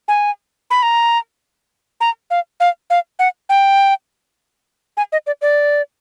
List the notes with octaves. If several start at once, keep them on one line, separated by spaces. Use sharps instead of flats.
G#5
B5
A#5
A#5
F5
F5
F5
F#5
G5
G#5
D#5
D5
D5